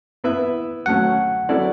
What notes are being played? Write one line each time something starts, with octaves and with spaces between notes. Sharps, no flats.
B3 E4 B4 E5
F#3 A3 C#4 F#5
F#3 C#4 E4 A4 D5